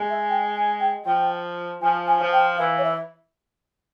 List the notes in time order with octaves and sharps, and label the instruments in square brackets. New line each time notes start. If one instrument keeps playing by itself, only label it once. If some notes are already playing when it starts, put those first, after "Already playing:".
Already playing: [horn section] G#3
[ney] E5
G5
G#5
G5
[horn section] F3 [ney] G5
[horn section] F3 [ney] G#5
[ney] G#5
[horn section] F3
[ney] G5
[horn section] E3 [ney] F5
[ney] C#5
E5